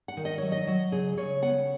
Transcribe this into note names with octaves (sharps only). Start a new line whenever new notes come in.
F#5
D#3
D#5
F#3 C#5
D#5
F#3
C#3 G#4
C#3 C#5
B3 F#5